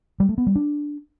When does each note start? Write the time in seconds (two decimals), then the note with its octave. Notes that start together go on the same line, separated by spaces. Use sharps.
0.20 G3
0.29 A3
0.38 B3
0.47 G3
0.55 D4